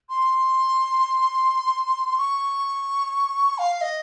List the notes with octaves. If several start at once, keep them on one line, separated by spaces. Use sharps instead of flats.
C6
C#6
F5
D#5